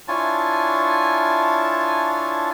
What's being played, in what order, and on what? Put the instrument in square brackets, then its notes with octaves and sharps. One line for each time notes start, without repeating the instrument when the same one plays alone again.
[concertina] D4 E4 F4 C#5 G#5 A5